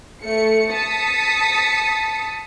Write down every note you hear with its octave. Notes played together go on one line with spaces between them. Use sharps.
A3 C#7
A5 D#6 B6 C#7